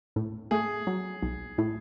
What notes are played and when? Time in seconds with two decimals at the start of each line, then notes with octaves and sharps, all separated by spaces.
0.16 A2
0.51 A3 G#4
0.87 F#3
1.22 B1
1.58 A2